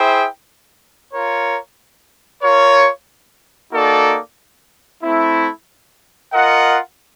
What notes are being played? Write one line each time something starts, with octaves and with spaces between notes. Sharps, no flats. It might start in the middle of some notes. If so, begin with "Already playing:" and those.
Already playing: E4 G#4 C5 E5 G5
F4 A#4 C#5
F4 A#4 C#5
A#3 D#4 F#4 A4 D5
A3 C4 E4
F4 A#4 D#5 F#5